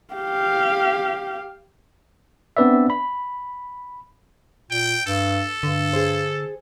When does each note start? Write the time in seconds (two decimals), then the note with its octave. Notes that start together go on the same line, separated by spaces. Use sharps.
0.14 G4 F5
2.57 B3 C4 D4 B4 D5 E5
2.90 B5
4.71 A#2 G5
5.06 G2 A4
5.63 G2 D3
5.93 G#4 C5